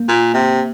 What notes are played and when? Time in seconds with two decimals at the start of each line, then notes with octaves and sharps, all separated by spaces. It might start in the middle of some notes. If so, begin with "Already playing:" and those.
Already playing: A#3
0.09 A#2
0.34 C3